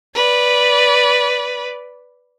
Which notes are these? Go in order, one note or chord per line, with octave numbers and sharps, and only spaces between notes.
B4 D5